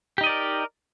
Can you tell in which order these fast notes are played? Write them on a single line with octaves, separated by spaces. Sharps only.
G4 D#4 D#5 D5 A#4